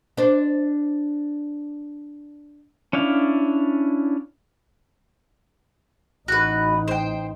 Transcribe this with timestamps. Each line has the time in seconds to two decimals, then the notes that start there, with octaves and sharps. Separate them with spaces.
0.17 D4 C5
2.93 C#4 D4 E4 F5
6.28 A1 D#4 F#4 B4
6.88 C5 G5